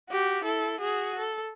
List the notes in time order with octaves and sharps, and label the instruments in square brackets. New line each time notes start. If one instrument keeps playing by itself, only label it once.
[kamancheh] F#4 G4
E4 A4
F#4 G#4
A4